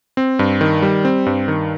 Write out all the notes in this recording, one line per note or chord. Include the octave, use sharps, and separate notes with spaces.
C4
G2
D#3
G3
C4
G2
D#3